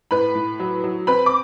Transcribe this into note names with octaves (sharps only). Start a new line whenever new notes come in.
A2 B4 B5
A2
F#3
F#3
C4 B4 B5
D6